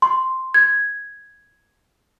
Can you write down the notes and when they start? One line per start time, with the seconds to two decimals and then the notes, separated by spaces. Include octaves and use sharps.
0.02 C6
0.54 G#6